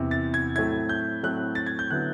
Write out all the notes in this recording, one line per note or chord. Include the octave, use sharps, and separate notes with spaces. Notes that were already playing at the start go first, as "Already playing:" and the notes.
Already playing: E2 C3 E3
A6
G#6
A2 F#3 A3 C4 E4 G#6
G6
A2 F#3 A3 C4 E4 F#6
A6
G#6
G6
D3 F#3 B3 E4 F#6